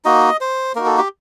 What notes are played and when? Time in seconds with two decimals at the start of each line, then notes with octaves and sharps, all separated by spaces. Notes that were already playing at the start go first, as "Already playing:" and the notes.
0.05 A#3 D#4 F#4 D#5
0.41 C5
0.75 A#3 D#4 F#4 A#4
0.86 A4
0.98 G4